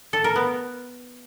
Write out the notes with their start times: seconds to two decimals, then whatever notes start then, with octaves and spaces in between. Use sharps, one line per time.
0.13 A4
0.24 A#4
0.36 B3